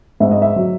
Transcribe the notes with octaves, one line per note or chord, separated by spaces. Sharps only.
G#2 E5
D#5
E5
F#3